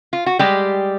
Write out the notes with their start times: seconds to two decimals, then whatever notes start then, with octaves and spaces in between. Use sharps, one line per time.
0.13 F4
0.26 F#4
0.39 G3 G#3 G4